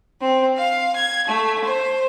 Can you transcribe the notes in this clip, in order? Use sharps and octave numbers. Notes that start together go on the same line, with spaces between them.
C4
F5
G#6
A3
C5